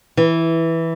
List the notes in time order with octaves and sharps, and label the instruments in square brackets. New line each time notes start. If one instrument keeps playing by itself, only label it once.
[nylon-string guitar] E3